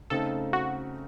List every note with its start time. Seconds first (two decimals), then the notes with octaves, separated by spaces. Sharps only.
0.10 C#3 A3 C4 D#4 A4
0.53 F#4